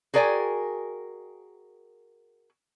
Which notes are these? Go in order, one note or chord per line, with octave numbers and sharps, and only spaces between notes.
F#4 G#4 A#4 D5 G5 G#5